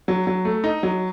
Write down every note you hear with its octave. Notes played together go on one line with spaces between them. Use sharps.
F#3
F#3
A3
D#4
F#3